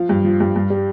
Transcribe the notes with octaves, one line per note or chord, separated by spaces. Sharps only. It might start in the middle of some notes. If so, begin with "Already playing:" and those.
Already playing: F3 F5
G2
F3
G2
G2
G3